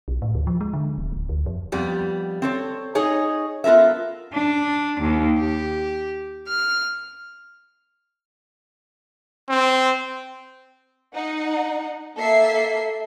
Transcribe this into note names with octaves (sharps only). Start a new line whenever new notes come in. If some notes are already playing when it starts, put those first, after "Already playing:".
B1
A2
D2
F3
G#3
D3
D#1
D1
D2
F2
F2 G3 B3
C4 A4 C#5
D#4 G#4 C#5 D#5
B3 F4 A4 A#4 E5
D4
D#2
G4
F6
C4
D#4 F#5
A#3 A4 E5 C7